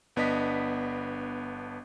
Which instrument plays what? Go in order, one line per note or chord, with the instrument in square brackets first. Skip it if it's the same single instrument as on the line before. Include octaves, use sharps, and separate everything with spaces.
[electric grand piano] G1 B3 D4 D#5 B6